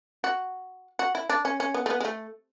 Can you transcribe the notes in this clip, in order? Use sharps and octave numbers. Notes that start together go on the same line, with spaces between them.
F#4
F#4
E4
D4
C#4
C#4
B3
A3
B3
G#3
A3